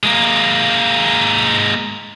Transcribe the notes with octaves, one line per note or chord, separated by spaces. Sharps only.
G#3 A#3